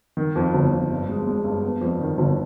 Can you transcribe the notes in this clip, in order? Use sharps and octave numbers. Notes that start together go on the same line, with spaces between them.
D#3
F2
G1
F2
G2
G#3
G#3
G2
B3
F2
D#3
G1